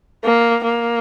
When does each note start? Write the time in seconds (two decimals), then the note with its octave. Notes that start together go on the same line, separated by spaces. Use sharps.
0.24 A#3
0.64 A#3